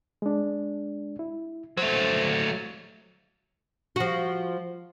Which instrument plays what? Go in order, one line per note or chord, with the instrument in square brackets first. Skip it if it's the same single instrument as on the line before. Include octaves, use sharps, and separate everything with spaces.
[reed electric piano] G#3 D4
E4
[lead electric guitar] F#3 A3 [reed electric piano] C5
[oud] F3 F#4